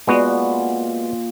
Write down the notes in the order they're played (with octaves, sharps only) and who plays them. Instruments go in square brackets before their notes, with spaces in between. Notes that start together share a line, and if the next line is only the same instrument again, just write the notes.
[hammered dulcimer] A#2 C6 [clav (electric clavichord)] G#3 B3 F#4